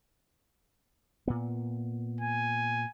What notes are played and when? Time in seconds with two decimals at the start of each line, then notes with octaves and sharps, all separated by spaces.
1.28 A#2 B3
2.21 G#5